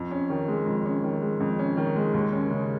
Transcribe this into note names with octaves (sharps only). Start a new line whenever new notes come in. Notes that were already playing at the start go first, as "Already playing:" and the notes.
Already playing: F2
C#4
D#3
G#3
F2
C#4
D#3
G#3
F2
C#4
D#3
G#3
D#2
C#4
C#3